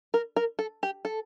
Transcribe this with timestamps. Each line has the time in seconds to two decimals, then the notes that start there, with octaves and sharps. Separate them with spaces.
0.14 A#4
0.36 A#4
0.59 A4
0.83 G4
1.05 A4